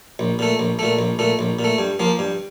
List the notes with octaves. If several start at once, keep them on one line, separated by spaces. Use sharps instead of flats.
A#1
A#2 A3
A#1
A#2 A3
A#1
A#2 A3
A#1
A#2
A3
G2
F3 A#3
G2